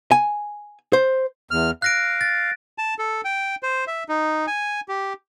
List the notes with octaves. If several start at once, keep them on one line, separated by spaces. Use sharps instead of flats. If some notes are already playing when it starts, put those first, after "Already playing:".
G#5
C5
E2 F6
F5 F#6 A#6 D7
A6
A5
A4
G5
C5
E5
D#4
G#5
G4